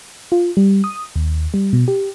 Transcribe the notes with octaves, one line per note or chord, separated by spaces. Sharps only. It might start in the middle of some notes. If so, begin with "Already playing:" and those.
F4
G3
D#6
D#2
G3
B2
G4